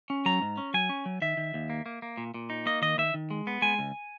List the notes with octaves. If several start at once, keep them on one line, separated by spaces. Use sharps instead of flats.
C#4
F#3 A#5
G#2
C#4
F#3 G#5
C#4
F#3
D#3 E5
D#3
D#2
A#3
A#3
A#3
A#2
A#2
D#4
A#3 D#5
D#3 D#5
D#3 E5
D#3
G#3
B3
G#3 G#5
C#2